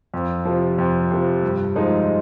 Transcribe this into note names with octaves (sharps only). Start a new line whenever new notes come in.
F2
C3 F3
F2
C3 F3
G2
F3 G#3 D#4